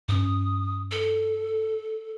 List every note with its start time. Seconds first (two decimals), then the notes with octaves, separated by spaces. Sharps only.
0.09 G2 C#4 D#6
0.91 A4